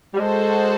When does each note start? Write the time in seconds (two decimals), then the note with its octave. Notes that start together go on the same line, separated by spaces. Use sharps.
0.14 G3
0.19 G#3 F#4 A4 C5